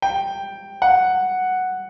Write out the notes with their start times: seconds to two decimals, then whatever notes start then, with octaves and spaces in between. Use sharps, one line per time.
0.02 G5
0.82 F#5